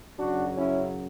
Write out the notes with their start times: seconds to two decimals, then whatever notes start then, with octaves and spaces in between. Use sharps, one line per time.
0.19 F#2 C#3 F#3 D4 F#4
0.57 C#4 E4